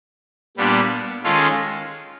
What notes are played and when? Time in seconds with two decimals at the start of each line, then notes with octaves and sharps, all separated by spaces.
0.57 A#2 G3 B3 D4
1.24 D#3 G#3 C#4 F4 A4